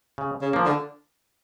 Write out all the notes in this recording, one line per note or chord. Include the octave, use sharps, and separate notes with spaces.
C#3
C#3
F3 A#3
D3